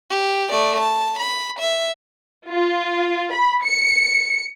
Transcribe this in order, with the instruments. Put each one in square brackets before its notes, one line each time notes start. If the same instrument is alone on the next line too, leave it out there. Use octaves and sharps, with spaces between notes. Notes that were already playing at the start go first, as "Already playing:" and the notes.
[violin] G4
A3 D5
A5
B5
E5
[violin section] F4
B5
C#7